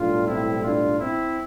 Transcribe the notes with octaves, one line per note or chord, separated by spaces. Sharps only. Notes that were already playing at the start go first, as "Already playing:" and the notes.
Already playing: B1 A2 G3 D4 F4
C4 E4
D4 F4
C4 E4